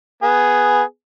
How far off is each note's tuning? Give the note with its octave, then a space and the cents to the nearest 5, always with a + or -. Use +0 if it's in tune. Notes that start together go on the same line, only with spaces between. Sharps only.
B3 +0 G#4 +0